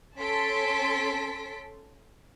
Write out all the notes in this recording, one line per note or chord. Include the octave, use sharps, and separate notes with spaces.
C#4 A4 A5 C6 B6 D7